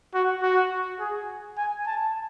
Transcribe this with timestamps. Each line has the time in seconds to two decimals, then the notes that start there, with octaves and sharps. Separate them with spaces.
0.14 F#4
0.43 F#4
0.99 G#4
1.58 G#5
1.87 A5